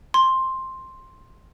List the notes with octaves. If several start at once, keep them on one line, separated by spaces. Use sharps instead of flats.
C6